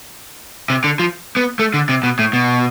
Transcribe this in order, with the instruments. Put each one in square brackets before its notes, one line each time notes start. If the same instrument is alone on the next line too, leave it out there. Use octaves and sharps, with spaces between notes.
[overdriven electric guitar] C3
D3
F3
B3
A3
D3
C3
B2
A2
B2